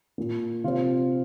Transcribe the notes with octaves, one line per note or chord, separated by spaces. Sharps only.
A#2 A#3
C3 F3 C4 F4